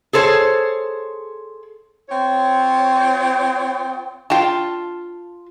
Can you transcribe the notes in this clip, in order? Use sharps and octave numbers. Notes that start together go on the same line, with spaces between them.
G#4 A4 C5 C#5
C4 F4 C#5
D4 F4 G5 A5